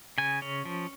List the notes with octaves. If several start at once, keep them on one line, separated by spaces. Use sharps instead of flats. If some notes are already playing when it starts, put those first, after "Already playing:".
C#3 G#5
C#4
F3